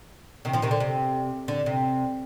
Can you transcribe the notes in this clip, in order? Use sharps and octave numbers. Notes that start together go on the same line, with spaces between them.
C3 D#3
D3 F3
C3 D#3
D3
C3
D3
C3